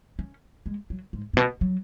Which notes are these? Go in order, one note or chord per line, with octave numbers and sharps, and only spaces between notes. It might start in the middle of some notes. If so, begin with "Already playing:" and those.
C#4
G#3
F#3
G#2
G#2
B2
F#3